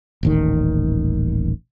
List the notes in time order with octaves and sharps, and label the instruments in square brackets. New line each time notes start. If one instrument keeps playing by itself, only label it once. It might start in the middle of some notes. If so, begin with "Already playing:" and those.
[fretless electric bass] D#1 A1 D#3